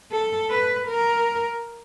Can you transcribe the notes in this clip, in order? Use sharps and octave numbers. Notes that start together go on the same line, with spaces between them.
A4
B4
A#4